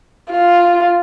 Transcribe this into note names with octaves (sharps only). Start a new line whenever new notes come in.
F4